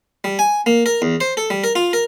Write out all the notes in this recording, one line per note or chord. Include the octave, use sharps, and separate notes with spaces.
G3
G#5
A#3
A#4
E2
C5
A4
G3
A#4
F4
A#4